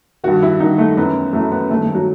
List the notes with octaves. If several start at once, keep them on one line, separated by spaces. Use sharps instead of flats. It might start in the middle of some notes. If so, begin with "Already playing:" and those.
G2 D#3 F#4
E4
G2 D#3 D#4
A3
F#2 E3 B3
F#2 E3 A3
B3
G2 D#3 A3
A3
F#3